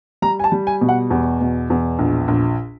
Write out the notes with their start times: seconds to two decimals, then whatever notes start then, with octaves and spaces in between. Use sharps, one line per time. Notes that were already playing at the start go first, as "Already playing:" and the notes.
0.22 G3 A#5
0.40 G#5
0.44 A5
0.52 G3
0.67 G#5
0.81 B2
0.89 F#5
1.11 E2
1.41 B2
1.70 E2
1.99 A#1
2.28 A#1